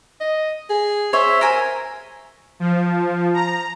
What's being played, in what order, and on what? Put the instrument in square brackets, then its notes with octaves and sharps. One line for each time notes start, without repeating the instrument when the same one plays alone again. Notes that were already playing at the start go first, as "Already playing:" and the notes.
[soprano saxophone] D#5
G#4
[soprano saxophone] C5 [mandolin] C#5 E5
[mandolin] A#4 E5 G#5
[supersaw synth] F3
A#5